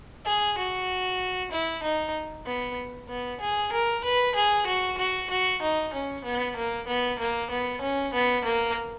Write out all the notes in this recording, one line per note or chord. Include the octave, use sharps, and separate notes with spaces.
G#4
F#4
E4
D#4
B3
B3
G#4
A#4
B4
G#4
F#4
F#4
F#4
D#4
C#4
B3
A#3
B3
A#3
B3
C#4
B3
A#3